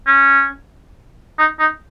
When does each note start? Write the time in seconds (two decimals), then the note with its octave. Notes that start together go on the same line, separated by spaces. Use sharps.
0.07 C#4
1.39 D#4
1.59 D#4